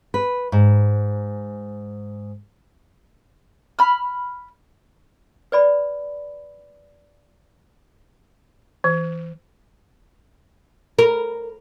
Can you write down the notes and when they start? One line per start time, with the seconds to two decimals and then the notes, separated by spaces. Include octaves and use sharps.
0.14 B4
0.52 G#2
3.79 B5 F6
5.52 B4 D5 B5
8.84 E3
10.99 A#4